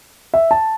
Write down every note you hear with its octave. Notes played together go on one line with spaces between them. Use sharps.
E5
A5